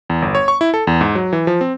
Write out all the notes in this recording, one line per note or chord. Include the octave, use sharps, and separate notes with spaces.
E2
G1
C#5
C#6
E4
A4
E2
G#2
F#3
E3
F3
C4